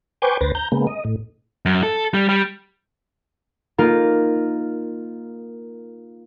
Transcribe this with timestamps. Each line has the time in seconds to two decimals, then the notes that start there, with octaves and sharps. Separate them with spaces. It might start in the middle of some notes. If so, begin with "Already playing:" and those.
0.22 B4 C5 G5 G#5 C#6 D6
0.41 D2 B4 C5 A6 A#6
0.55 A#5 G6
0.72 C#3 G#3 A#3 B3
0.87 D#5
1.05 A2
1.66 F#2
1.83 A4
2.14 G3
2.29 G3
3.78 A#3 D#4 F4 A#4